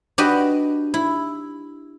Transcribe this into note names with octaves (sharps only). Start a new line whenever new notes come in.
D4 F#4 G4 B4 D#5
E4